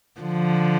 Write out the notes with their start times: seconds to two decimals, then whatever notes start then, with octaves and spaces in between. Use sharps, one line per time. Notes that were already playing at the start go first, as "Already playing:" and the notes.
0.21 D3 F3